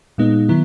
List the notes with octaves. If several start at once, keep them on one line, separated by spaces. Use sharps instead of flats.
A#2 G#3 B3 D#4
D#3 F#3 B3 E4